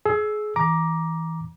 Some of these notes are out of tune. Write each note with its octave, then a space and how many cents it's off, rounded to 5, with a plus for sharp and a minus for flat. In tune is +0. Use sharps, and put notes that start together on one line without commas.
G#4 +30 E6 +0
E3 -15 A#5 +20 D6 +0